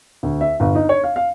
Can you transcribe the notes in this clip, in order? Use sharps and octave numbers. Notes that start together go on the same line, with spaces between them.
D2
E5
G1
D#4
C#5
F5
F5